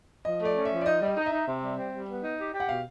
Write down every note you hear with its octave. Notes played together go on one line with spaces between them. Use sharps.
F3 D#5
A3 D5
C#4
E5
F3
D5
D#4 D#5
G3
D#5
D#4
E5
D#4
C3
G3
C4
G3
B3
D#4
G4
G4
F#5
B2 F5